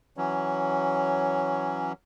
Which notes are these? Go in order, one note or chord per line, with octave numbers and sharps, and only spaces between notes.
E3 F#3 C#4